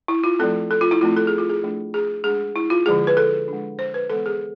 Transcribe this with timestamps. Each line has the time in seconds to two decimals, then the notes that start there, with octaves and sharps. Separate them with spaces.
0.08 E4
0.24 F4
0.39 F3 A3 C4 A4
0.71 A4
0.81 F4
0.91 E4
1.01 F3 A3 C4 F4
1.17 A4
1.27 G#4
1.38 F4
1.49 G#4
1.63 F3 A3 D4
1.94 G#4
2.24 G#3 D4 G#4
2.56 E4
2.70 F4
2.86 D3 F3 G#3 G#4
3.07 B4
3.17 A4
3.48 G#3 D4
3.79 C5
3.94 B4
4.10 E3 G#3 B3 A4
4.26 G#4